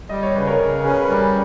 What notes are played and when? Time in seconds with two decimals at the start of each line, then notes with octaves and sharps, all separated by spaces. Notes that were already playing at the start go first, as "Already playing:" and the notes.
0.09 G3 D#5
0.23 C#5
0.35 C#3 B4
0.47 A#4 C#5
0.59 C#3
0.84 C#4 G#4 B4
1.02 B4
1.09 G3 A#4 C#5